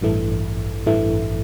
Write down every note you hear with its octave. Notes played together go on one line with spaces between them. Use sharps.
A1 G2 E3 A3
A1 G2 E3 A3